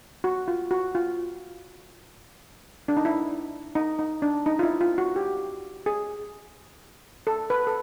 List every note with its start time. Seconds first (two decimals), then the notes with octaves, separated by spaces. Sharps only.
0.24 F#4
0.48 F4
0.71 F#4
0.95 F4
2.88 D4
2.97 D#4
3.05 E4
3.75 D#4
3.99 D#4
4.22 D4
4.46 D#4
4.59 F4
4.63 E4
4.81 F4
4.98 F#4
5.16 G4
5.86 G#4
7.27 A4
7.50 B4
7.67 A4